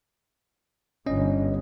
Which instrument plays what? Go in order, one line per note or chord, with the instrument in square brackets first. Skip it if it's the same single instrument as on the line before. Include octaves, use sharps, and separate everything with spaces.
[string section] G1 [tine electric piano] C#4 D#5